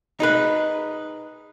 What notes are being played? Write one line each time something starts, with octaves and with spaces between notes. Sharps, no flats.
D#4 G#4 B4